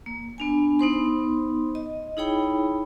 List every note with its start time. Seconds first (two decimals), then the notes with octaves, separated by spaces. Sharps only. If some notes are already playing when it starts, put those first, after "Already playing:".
0.06 A#3
0.38 B3 D4 G#5
0.79 B3 D#4 C5 C6
1.75 D#5
2.17 D#4 E4 G#4 C#5 G5 B5